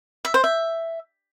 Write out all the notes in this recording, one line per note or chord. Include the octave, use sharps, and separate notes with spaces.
E5
C5
E5